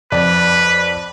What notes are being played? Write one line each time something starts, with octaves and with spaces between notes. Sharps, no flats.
F2 B4 D5